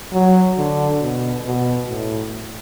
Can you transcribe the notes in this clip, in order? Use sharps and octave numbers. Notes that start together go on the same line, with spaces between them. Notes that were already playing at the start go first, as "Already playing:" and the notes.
F#3
D3
B2
B2
A2